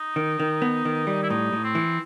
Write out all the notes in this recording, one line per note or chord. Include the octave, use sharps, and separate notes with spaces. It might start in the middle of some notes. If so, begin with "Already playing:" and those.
Already playing: D#4
D#3
D#3
B3
D#3
G3
E4
A2 D#4
A2
C4
E3